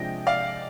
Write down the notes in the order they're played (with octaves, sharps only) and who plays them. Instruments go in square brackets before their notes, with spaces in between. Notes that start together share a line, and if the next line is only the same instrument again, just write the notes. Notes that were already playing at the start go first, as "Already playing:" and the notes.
Already playing: [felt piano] C3 F3 G#3 D4 [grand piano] D#5 G5
[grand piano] D5 F5